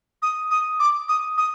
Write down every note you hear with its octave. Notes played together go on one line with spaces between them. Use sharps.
D#6
D#6
D6
D#6
D#6